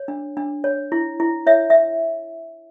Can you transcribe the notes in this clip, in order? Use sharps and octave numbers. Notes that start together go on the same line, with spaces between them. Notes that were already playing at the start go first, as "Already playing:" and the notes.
Already playing: C#5
D4
D4
C#5
E4
E4
C#5 E5
E5